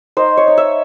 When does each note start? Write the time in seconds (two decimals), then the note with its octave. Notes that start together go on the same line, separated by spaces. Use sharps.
0.17 D#4 C5
0.37 C#5
0.47 D#4
0.57 E5